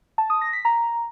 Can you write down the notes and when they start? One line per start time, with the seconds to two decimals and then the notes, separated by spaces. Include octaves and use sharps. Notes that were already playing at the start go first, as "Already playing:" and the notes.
0.18 A5
0.30 D#6
0.41 A#6
0.53 B6
0.65 A#5